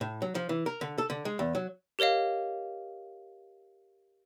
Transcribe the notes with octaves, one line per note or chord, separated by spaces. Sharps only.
A2
F#3
F3
E3
A#4
D3
A4
D3
G#3
E2
F#3
G4 A#4 C#5 D#5 F5